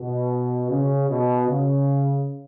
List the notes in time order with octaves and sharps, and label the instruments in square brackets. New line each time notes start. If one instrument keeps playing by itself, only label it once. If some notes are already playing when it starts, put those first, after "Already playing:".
Already playing: [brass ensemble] B2
C#3
B2
C#3